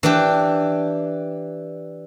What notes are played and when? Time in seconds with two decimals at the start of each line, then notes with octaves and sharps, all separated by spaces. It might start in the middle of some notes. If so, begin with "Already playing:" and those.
0.03 E3 D4 G4